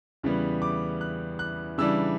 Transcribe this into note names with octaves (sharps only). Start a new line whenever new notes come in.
E2 C#3 E3 G3 B3
D6
F#6
F#6
C#3 E3 G3 D4 E6